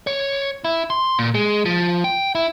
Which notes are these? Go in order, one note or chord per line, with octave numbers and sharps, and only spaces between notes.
C#5
E4
C6
A#2
G#3
F3
G5
E4